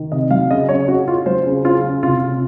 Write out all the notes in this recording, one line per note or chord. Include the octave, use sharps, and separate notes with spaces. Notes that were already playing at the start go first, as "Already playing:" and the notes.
Already playing: D#3
C3 D#5
F#3 F5
C#3 D#5
C#3 C#5
C#3 F#4
C#3 F4
F#3 C5
C#3
C#3 F4
C#4
C3 F4
C3